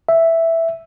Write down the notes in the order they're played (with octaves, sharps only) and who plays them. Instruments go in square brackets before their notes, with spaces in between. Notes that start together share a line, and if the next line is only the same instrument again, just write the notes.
[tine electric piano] E5